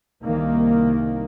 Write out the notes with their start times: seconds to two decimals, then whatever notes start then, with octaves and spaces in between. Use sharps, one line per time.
0.23 C2 D#3 A#3